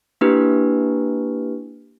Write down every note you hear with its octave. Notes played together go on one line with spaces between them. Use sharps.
A#3 D4 E4 G4 B4